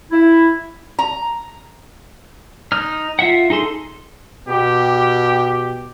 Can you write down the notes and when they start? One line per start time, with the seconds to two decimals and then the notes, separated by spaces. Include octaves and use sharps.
0.11 E4
0.99 A#5
2.72 D#4 F6
3.19 F4 E5 F#5
3.50 D#4 G#4 A4 C6
4.49 B2 G4